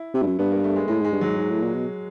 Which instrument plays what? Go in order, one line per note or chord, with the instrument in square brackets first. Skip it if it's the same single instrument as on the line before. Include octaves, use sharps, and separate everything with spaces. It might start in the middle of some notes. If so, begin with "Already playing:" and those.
Already playing: [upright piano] E4
[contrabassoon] C3 [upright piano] E4
[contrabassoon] G2
F#2
[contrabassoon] G2 [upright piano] B3
[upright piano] A#3
A3
G#3
[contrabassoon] A2 [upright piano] G#3
[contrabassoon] G#2 [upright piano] G#3
[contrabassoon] G2
[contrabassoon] G#2 [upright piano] F#3
[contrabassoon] G#2
A2
A#2
B2